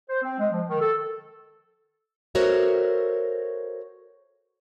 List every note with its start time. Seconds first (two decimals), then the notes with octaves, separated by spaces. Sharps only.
0.09 C5
0.22 C4
0.40 G#3
0.52 F3
0.68 D#3
0.80 A4
2.35 F#4 A4 A#4 C5 C#5 E5